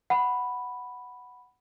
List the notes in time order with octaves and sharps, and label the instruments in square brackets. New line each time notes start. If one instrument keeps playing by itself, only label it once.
[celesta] F#5 B5